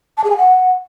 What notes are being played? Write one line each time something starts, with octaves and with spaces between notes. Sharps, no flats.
A5
G#4
G#5
F#5